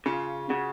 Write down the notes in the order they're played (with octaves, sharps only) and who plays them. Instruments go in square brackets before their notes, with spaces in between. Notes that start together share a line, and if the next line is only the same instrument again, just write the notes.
[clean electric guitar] C#3 [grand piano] F4
[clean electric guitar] C#3 [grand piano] F#4